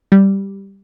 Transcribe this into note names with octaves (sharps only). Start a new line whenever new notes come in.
G3